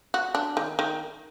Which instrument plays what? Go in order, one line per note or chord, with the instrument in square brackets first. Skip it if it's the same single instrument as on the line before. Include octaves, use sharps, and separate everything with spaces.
[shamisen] F#4
D4
D#3
D#3